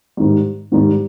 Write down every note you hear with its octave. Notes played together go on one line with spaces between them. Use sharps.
G#2 D#3 G3
G#2 D#3 G3